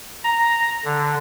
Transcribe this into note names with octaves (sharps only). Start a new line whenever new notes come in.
A#5
D3